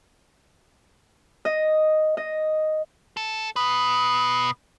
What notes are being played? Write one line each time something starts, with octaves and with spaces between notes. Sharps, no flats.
D#5
D#5
A4
B2 B4 D#6